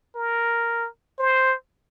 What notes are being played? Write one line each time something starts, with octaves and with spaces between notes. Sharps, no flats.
A#4
C5